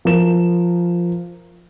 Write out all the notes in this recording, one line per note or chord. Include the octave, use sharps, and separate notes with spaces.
F3 A#4 E7